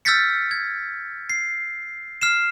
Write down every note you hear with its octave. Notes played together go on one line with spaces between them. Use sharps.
E6 F6 G6 A6 B6 C#7
G#6
C7
F6 C7 E7